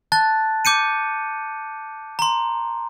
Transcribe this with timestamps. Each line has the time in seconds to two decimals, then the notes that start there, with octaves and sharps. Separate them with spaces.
0.12 A5 F#6 A6
0.65 D6 G6 C#7 D#7
2.19 A#5 C6